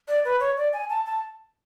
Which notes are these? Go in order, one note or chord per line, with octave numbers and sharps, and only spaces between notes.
D5
B4
C#5
D5
G#5
A5
A5